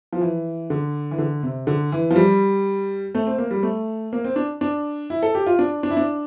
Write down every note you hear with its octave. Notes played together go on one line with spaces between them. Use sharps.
F3
E3
D3
E3
D3
C3
D3
E3
F3
G3
A3
C4
A#3
G3
A3
A#3
C4
D4
D4
E4
A4
G4
F4
D4
D4
E4
D4